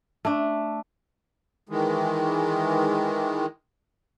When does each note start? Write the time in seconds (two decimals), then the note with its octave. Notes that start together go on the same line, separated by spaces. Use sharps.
0.25 A3 D4
1.69 D#3 E3 G#3